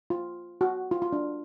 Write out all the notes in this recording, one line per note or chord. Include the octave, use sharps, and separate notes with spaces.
F4
F#4
F4
F4
D4